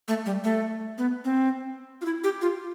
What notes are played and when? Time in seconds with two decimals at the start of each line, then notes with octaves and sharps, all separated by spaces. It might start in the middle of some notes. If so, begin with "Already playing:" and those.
0.08 A3
0.26 G3
0.44 A3
0.98 B3
1.25 C4
2.01 F4
2.05 E4
2.24 G4
2.41 F4